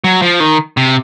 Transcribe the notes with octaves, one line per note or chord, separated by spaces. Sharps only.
F#3
F3
D#3
C3